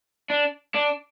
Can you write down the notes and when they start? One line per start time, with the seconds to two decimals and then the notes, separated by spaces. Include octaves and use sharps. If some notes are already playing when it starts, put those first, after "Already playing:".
0.30 D4
0.75 D4